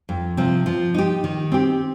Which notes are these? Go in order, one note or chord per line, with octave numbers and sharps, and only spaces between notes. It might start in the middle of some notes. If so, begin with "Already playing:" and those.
F2
C3 F3 C4
F3
D#4 G4
D#3
C4 G4